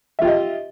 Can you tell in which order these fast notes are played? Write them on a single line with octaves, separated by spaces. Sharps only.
E5 F4 G4 D#5